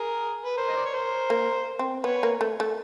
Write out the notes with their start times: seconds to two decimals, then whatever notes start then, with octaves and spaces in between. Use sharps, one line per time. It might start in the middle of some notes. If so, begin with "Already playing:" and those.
Already playing: G#4 A#4
0.45 B4
0.56 A#4 C5
0.68 D#5
0.77 D5
0.85 C#5
0.94 A#4 C5
1.30 A#3
1.79 C4
2.03 B3 B4 C#5
2.23 A#3
2.41 A3
2.60 A3